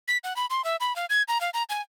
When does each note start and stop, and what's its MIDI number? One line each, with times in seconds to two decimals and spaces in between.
0.08 0.18 95
0.24 0.36 78
0.36 0.46 83
0.50 0.64 84
0.64 0.76 76
0.80 0.95 83
0.96 1.06 77
1.10 1.23 92
1.28 1.41 82
1.41 1.50 77
1.54 1.63 82
1.70 1.81 80